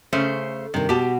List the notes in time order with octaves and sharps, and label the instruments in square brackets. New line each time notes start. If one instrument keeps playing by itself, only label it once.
[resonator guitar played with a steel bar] C#3 A3 C5 [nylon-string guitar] C#4
[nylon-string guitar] G2 D#3 [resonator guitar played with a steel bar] C3
[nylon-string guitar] B2 F#4 [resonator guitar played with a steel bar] G4 A5